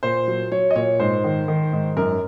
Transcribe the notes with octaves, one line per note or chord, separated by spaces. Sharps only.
A#2 C5
F#3
F#3 C#5
D#5
A#2 C#5
G#2 C5
D#3
D#3
G#2
F#2 A#4